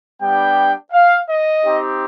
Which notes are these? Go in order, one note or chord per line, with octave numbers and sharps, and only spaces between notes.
G3 B3 D4 G4 G5
F5
D#5
C4 D#4 G4